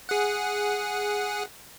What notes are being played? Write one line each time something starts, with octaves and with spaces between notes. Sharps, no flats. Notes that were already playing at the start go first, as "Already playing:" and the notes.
G#4 F#5